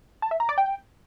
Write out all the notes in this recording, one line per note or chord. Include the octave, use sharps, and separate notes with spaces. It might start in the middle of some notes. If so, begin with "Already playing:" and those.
A5
E5
A#5
D5
G5